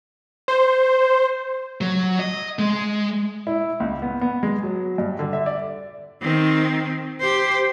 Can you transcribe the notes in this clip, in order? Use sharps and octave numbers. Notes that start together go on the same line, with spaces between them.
C5
F#3
D#5
G#3
E4
C#2
B3
B3
G#3
F#3
G2
D3
E5
D5
D#3 C4
G4 C5